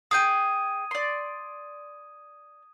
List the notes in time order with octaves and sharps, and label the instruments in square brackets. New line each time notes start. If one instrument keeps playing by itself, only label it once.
[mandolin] G#4 G5 G6 [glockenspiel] D#6 G#6 D#7
[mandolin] D5 C6